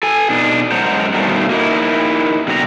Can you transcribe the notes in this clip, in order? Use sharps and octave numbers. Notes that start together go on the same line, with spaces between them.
A4 G#5
B2 D4 D#4
F#2 G#3 C5 F#5 A5 A#5
B2 D#3 G3 A3 A#3
A#3 D#4 E4
B2 D3 F#3 G4 B4 A#5